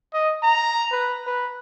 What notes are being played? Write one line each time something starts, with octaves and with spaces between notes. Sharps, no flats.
D#5
A#5
B4
B4